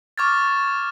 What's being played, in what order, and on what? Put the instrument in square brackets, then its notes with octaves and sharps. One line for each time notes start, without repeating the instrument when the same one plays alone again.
[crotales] C#6 D6 F6 G#6 A6